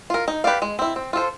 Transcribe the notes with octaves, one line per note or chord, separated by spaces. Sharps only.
F4 A#4
D#4
G4 B4 D5 F5
G#3
C4 E4
C4
F4 A4 C5